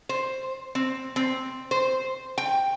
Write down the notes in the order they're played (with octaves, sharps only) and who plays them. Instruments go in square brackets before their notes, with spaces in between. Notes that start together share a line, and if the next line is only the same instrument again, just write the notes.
[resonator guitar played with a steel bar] C5
C4
C4
C5
G5